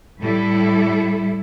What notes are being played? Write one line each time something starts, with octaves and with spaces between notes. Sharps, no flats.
A2 G3 E4 A4